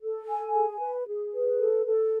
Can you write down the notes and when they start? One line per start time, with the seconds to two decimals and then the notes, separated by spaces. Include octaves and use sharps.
0.01 A4
0.28 G#5
0.54 G#4
0.80 B4
1.07 G#4
1.33 B4
1.59 A4
1.86 A4